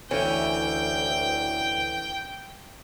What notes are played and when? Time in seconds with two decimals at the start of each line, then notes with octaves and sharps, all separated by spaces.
0.11 D2 E3 C#4 G5